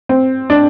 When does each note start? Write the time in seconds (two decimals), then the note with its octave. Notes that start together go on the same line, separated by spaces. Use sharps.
0.09 C4
0.50 D4